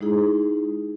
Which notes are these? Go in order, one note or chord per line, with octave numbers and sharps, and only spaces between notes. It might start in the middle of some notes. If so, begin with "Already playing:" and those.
G#3 D#4 E4 G#4